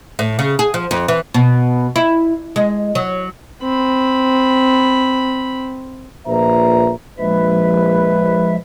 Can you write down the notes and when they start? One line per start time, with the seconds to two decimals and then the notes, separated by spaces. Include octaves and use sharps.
0.19 A2
0.39 C#3
0.59 G#4
0.74 F3
0.91 F2
1.08 E3
1.34 B2
1.96 E4
2.56 G#3
2.95 F#3
3.62 C4 B5
6.27 A#1 A#2 B4 E5 A#5
7.19 A#1 F3 G#3 B4 E5